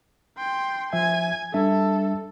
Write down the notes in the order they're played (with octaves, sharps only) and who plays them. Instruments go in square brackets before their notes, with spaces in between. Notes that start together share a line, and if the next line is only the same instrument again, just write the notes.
[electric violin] G5 C6
[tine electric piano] F3 E5 [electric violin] G#5
[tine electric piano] G3 D4 E5 [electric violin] A4